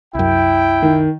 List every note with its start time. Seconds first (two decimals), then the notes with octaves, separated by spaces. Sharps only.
0.15 C2 F#2 E4 G5
0.82 D#3